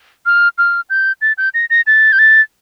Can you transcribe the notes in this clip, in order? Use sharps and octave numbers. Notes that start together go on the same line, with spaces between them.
F6
F6
G6
A6
G6
A#6
A#6
A6
G6
A6